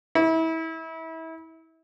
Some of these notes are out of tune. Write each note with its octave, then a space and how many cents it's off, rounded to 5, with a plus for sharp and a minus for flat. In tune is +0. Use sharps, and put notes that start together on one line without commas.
E4 -30